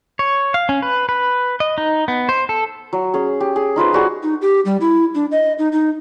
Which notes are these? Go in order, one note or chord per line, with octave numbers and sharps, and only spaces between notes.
C#5
F5
C#4
B4
B4
D#5
D#4
B3
C5
A4
F#3
C#4 G#4
G4
G#4
D#4 F4 B4 C5
G3 F#4 G#4
D#4
G4
G3
E4
D4
D#5
D#4
D#4